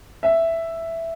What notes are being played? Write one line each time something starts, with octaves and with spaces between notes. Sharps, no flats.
E5